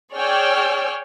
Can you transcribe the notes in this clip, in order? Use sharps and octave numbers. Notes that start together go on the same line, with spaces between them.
G#4 C#5 D5 G5 E6 F6